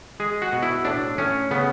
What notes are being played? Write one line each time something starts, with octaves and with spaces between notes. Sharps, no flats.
G#3 G#4
F#4
B2
E4
A2 D4
A2 C#4
C#3 B3